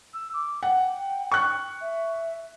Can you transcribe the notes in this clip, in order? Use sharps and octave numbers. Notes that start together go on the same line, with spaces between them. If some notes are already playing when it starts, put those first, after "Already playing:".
E6
D6
F#5 G5
C#6 F#6
E5